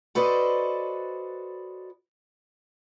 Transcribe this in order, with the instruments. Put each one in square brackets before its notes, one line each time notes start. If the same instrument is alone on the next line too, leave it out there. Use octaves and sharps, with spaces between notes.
[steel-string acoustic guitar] F#4 A4 B4 C5 D5 D#5